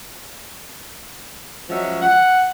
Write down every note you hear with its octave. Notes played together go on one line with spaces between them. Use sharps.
F3 F#3 G#3 C#4 F#4 E5
F#5